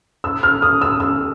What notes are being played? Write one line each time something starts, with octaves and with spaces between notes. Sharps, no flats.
E6
F6
D#6
E6
E6